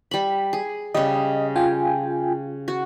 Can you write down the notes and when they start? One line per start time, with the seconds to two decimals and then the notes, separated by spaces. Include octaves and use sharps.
0.11 G3 B5
0.53 G#4
0.94 C#3 G3 D#5
1.55 F4 G5 G#5
2.68 F#4